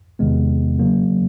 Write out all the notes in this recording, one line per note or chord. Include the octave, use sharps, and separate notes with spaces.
E2 C3 D#3 G#3 B3
C#3 F#3 A#3